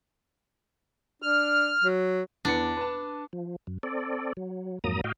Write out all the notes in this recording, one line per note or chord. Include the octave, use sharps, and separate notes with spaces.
D4 F6
F#3
E2 D4 B4 C#7
B4 A5
F3
F#2
C4 A4 D5
F#3
F2 G#2 F#3 A#3 A#5 D#6
A2 F#4 D#5 F5 G5